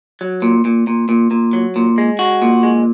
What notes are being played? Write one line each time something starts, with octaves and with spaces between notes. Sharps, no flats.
F#3
A#2
A#2
A#2
A#2
A#2
F#3
A#2
G#3
F#4
A#2
G#3